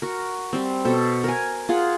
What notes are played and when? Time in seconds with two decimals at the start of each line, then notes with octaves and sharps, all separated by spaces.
0.02 F#4 A#4
0.53 G3 C4
0.84 B2 A4 C5
1.24 A#4 G#5
1.69 F4 G#4 F#5